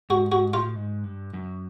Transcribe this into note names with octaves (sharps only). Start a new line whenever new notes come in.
G#2 F#4
G#2 F#4
A2 F4
G#2
G2
F#2